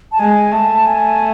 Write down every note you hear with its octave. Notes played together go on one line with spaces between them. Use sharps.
A5
G#3 G#5
A3 A5
G#5